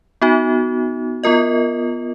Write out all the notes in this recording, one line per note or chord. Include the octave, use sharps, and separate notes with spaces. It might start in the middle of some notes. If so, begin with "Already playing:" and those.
B3 D#4 F#4
B3 F4 A#4 D#5